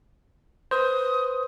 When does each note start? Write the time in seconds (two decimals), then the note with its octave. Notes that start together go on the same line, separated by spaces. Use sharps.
0.71 B4 C5 D#6